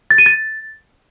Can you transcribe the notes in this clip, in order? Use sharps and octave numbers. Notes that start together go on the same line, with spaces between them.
A6
D#7
A6